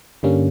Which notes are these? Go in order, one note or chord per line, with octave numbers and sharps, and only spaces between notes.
G2 D3 G3 A#3 C#4